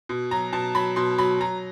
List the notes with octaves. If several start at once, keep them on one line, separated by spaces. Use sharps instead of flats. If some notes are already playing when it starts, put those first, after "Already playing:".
B2
F#3 A#5
B2 A5
F#3 B5
B2 C6
F#3 B5
F#3 A#5